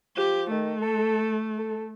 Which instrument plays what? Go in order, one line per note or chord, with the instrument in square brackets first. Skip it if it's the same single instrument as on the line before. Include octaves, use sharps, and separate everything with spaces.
[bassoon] F3 [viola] G4
[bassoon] D#3 [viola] A3
[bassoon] A4
A4